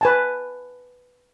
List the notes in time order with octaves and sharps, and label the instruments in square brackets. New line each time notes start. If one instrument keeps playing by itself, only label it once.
[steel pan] B4 G#5 A5